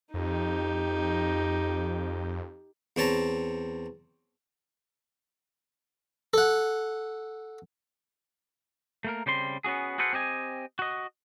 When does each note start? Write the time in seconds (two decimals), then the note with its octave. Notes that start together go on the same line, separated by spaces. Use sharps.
0.14 F2 D#4 G4
2.96 E2 C4 C#5 A5 A#5
6.34 A4 F#5
9.05 A3 A#3 A#4
9.26 C#3 G3 C4 C6
9.64 B3 C#4 F#4 G#4
9.98 F#4 G#4 A4 B4 C5 F#5
10.13 C4 G4 D#5 G#5
10.79 F#4 D#5